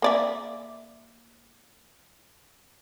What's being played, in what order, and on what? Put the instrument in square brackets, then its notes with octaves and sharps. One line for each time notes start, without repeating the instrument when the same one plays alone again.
[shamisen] A#3 D5 E5